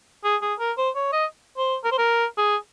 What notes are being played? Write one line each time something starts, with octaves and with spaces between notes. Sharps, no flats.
G#4
G#4
A#4
C5
C#5
D#5
C5
A#4
C5
A#4
G#4